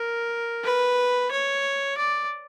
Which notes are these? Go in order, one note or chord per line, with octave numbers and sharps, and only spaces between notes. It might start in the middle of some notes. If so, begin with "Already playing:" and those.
Already playing: A#4
B4
C#5
D5